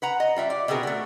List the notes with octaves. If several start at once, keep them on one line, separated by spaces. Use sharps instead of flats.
B4 F#5 A#5
D#5
G3 F4 E5
D5
B2 D3 C4 G#4 A#4
A3 F#4